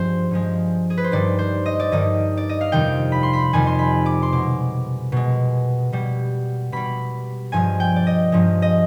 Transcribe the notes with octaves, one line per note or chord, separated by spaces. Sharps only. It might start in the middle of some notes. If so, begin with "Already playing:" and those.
Already playing: G2 F3 G#3 C5
G2 F3 G#3
G#4
B4
C5
G2 D#3 G3 D5
C5
D#5
D5
G2 D#3 G3 D#5
D5
D#5
F5
F2 C3 D#3 G3 G5
B5
C6
B5
F2 C3 D#3 G3 G#5
C6
B5
D6
C6
B2 G#3 D6
B2 G#3
B2 G3
B2 G3 B5
G2 F3 G#3 G#5
G5
D5
D#5
G2 F3 G#3
D#5